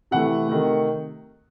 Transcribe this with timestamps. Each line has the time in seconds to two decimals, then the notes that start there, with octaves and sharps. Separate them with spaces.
0.11 C3 E3 A3 F#5
0.48 C3 D#3 A3